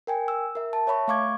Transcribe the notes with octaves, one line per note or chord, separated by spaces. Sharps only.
A#4 G5 G#5
E6
A#4 E5
A5
C#5 E5 B5 C#6
A3 F5 C#6 D6 G#6